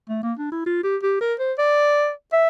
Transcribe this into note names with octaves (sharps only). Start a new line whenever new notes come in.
A3
A#3
D4
E4
F4
G4
G4
A#4
C5
D5
E5